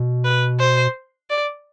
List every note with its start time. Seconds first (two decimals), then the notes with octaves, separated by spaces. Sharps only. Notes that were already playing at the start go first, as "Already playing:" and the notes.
Already playing: B2
0.25 B4
0.60 C5
1.30 D5